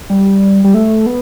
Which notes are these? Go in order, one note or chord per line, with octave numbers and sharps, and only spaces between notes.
G3
G3
A3
B3